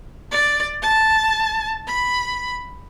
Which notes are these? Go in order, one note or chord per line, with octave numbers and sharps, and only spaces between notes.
D5
A5
B5